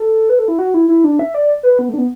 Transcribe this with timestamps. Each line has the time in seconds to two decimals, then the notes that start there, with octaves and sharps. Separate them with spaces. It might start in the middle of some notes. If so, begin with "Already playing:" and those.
Already playing: A4
0.29 B4
0.39 A4
0.48 E4
0.59 F#4
0.74 E4
0.88 E4
1.04 D4
1.19 E5
1.34 D5
1.63 B4
1.79 B3
1.89 A3
1.94 D4
1.98 B3